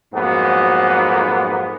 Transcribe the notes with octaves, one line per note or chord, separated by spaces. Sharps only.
F2 G#2 F#3 A#3 B3